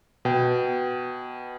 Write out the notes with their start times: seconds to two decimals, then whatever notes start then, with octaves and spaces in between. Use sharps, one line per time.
0.25 B2 G5